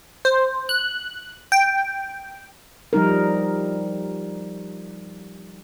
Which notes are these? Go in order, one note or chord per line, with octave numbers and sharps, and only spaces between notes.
C5
F#6
G5
F3 G3 D#4 A#4